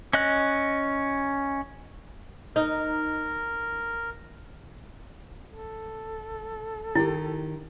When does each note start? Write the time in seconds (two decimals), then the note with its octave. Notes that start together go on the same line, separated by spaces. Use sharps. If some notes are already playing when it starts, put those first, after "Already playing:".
0.13 C#4 D#5 F#6
2.56 D#4 A#4
5.49 A4
6.95 D#3 E4 G4